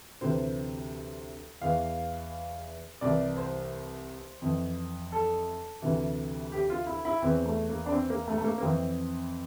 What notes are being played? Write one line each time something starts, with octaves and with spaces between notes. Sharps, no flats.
D2 C3 E3 C5
E2 E3 F5
C2 C3 E3 D5
C5
F2 E3
A4
D2 C3 E3
G4
F4
E4
E4
E2 E3 C4
A3
A#3
D4
C4
A#3
A3
A3
A#3
A#3
F2 E3 C4